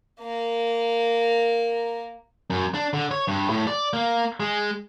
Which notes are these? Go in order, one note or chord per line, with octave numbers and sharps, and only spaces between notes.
A#3 A#4
F#2
D4
D3
C#5
G2
A2
D5
A#3
G#3